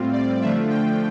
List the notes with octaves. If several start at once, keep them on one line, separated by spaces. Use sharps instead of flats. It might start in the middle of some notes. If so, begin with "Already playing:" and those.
Already playing: A2 G3 C4 F4
D5
D3 F3 A3 D4 F4 E5
G5